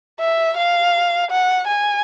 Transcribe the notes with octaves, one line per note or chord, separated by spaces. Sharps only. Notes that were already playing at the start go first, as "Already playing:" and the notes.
E5
F5
F#5
G#5